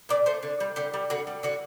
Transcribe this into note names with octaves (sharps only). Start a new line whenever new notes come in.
A#2 D5
A3 C5
D3
G3
D3 G4
G3
D3 F#4
G3
D3 F#4